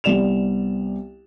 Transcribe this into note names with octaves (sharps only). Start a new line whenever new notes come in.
C2 B3 D5 E7 F7